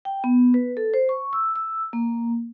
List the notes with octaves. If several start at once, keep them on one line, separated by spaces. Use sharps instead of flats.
G5
B3
B4
A4
C5
C#6
E6
E6
A#3